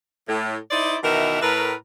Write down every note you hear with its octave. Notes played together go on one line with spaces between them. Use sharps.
A2
D#4 E4 C5 D5
B2 D#3 E3 D#4 A#4 E5
A2 A#4 B4